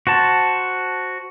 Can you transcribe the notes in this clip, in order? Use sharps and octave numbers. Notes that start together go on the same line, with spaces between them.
F#4 C5 A5